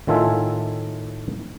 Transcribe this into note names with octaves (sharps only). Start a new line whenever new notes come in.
A2 D#3 F4 A4 E5 G#5